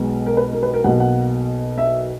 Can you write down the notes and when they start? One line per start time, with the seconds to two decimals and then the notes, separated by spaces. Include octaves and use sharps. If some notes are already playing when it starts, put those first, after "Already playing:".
Already playing: B1 B2 G#3 B3
0.26 A#4
0.37 B4
0.53 A#4
0.63 B4
0.74 A#4
0.84 B1 B2 A#3 F#5
1.00 F#5
1.78 E5